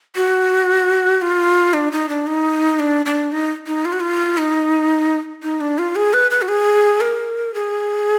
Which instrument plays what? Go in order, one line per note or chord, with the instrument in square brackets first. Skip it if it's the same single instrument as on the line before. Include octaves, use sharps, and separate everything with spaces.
[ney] F#4
F4
D4
D#4
D4
D#4
D4
D4
D#4
D#4
F4
F#4
F4
D#4
D#4
D4
F4
G#4
B4
B4
F#4
G#4
A#4
G#4